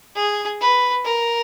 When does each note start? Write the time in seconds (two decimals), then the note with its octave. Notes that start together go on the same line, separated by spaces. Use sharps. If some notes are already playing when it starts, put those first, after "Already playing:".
0.15 G#4
0.61 B4
1.05 A#4